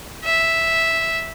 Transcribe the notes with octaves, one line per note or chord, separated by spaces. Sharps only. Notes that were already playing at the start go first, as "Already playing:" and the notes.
E5